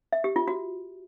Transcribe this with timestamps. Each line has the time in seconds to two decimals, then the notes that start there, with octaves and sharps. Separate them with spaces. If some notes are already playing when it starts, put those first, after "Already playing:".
0.13 E5
0.24 G4
0.36 F4
0.48 F#4